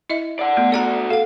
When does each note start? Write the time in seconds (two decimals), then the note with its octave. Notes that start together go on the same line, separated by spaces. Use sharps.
0.10 E4 D#5 E5
0.39 D5 F#5
0.57 A3 B3
0.72 F#4 A4 D5 F#5 A#5
1.10 A4 F5 F#5